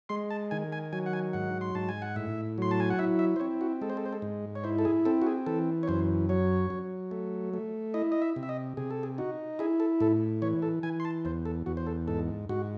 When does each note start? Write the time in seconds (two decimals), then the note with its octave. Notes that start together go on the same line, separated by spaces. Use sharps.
0.09 G#3 C6
0.30 A5
0.51 D#3 G#5
0.72 G#5
0.93 F#3 G#5
1.06 F#5
1.13 G#5
1.33 G#2 F#5
1.61 C6
1.75 G#2 A5
1.89 G#5
2.02 F#5
2.16 A2 E5
2.58 F#3 C6
2.71 A5
2.80 G#5
2.90 F#5
2.99 E4 E5
3.19 E5
3.36 C5
3.40 C4 C#5
3.61 F#4
3.81 G#3 A4
3.90 C5
3.97 A4
4.06 C5
4.13 A4
4.22 G#2
4.55 C#5
4.64 E4 C5
4.78 A4
4.85 G#4
5.05 C4 A4
5.22 F#4
5.27 G#4
5.46 E3 A4
5.83 C#5
5.88 F#2 C5
6.29 F#3 C#5
6.70 F#3
7.11 A3
7.53 A3
7.94 E4 D#5
8.12 D#5
8.22 E5
8.36 C3
8.43 E5
8.49 D#5
8.77 C3 G#4
8.91 A4
9.03 G#4
9.18 D#4 F#4
9.59 E4 G#4
9.80 A4
10.00 A2 A4
10.42 E3 C#5
10.62 A4
10.83 E3 G#5
11.00 C6
11.05 A5
11.25 E2 C5
11.45 A4
11.66 E2 F#4
11.77 C5
11.86 A4
12.08 G#2 A4
12.49 G#2 F#4